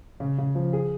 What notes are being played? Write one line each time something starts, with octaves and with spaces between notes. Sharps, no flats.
C#3
C#3
F3
G#4